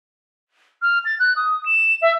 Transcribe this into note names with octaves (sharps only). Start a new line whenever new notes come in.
F6
A6
F#6
D#6
E7
E5